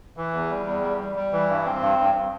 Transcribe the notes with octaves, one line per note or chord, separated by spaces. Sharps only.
E3
E2
G3
E2
G3
G3
G3
E3
G2
C4
G2
G2